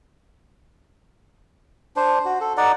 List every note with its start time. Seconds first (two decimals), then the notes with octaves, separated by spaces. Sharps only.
1.96 D4 C5
2.25 F#4
2.41 A4
2.57 D#4 D5 F#5